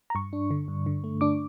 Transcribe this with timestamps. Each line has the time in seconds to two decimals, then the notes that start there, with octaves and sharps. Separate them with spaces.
0.10 A#5
0.15 G2 C#6
0.33 D4
0.51 D3
0.68 G2
0.86 D3
1.04 A3
1.21 D4 D6